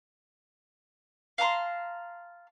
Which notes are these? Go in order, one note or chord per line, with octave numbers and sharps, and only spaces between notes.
F5 A5 A#5 C6